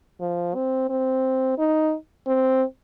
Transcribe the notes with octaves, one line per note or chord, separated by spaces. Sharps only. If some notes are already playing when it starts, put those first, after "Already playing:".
F3
C4
C4
D#4
C4